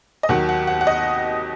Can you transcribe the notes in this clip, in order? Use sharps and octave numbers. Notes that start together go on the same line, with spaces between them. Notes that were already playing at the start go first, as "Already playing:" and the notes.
D#5
D#2 D#3 F#3 F#5
F#5
F#5
F#5
D#5